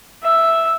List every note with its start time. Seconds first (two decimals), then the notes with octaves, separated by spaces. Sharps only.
0.23 E5